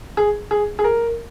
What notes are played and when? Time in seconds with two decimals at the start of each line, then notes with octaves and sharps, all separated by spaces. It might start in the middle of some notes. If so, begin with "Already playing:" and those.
0.17 G#4
0.51 G#4
0.79 G#4
0.84 A#4